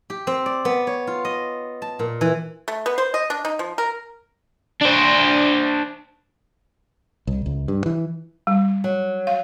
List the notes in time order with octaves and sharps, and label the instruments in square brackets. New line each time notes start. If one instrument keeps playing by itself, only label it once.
[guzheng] G4
C4
D5
B3
C#5
F4
D#5
A5
A#2
E3
[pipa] A3
B3
C5
D#5
D4
D#4
F3
A#4
[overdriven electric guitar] D4 C5
[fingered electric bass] C2
C#2
G2
E3
[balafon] G3
[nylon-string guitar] F#3
[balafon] F5